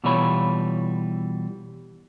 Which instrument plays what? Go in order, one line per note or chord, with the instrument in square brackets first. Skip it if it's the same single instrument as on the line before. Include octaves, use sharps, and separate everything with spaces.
[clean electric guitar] B2 E3 G3 F4 C#5 B5